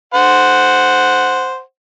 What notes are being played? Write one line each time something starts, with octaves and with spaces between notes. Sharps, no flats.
C5 F#5